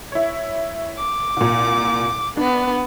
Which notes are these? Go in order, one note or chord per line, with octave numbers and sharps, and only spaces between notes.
E4 C#5
D6
C2 A#2
B3 D4